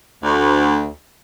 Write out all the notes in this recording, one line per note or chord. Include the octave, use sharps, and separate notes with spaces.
D2